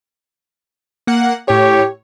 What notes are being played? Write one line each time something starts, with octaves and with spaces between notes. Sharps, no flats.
A#3 F#5
A2 G4 C#5